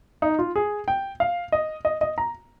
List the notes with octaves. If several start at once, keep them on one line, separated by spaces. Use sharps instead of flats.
D#4
F4
G#4
G5
F5
D#5
D#5
D#5
A#5